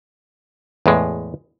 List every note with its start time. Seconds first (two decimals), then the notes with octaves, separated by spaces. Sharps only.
0.86 E2 A2 G#3